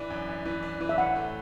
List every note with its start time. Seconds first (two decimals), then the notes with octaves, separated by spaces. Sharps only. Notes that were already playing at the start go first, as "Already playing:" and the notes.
Already playing: E3 D4
0.10 F#2
0.29 F#2
0.45 E3
0.63 D4
0.81 E3
0.89 E5
0.98 A1 F#5
1.16 A3